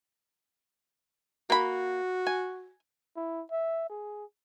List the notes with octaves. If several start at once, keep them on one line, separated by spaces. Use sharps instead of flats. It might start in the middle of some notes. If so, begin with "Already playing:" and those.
A#3 F#4 B5
G#5
E4
E5
G#4